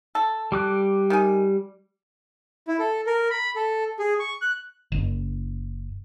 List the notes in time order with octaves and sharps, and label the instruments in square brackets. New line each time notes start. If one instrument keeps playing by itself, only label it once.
[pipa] A4
[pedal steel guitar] G3 D6 F#6
[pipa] D#3 G#5
[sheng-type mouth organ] E4
A4
A#4
B5
A4
G#4
C#6
F#6
[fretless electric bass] F#1